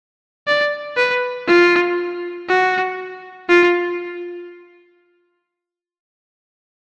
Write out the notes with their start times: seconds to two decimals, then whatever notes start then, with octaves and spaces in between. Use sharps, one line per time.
0.47 D5
0.97 B4
1.47 F4
2.49 F#4
3.49 F4